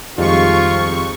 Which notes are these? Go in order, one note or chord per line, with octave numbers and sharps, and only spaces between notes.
F2 D#3 G3 G#3 F4 C#6